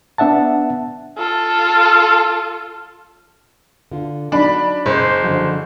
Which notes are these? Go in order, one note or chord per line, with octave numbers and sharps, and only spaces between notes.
B3 D4 E5 F#5 A5
F4 A4
D3 F4
F#3 D4 D#4 B5
F#1 C5 D#5
D3 F3 F#3